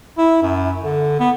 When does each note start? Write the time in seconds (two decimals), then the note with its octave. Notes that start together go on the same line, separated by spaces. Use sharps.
0.18 E4
0.43 F#2
0.84 D3
1.20 B3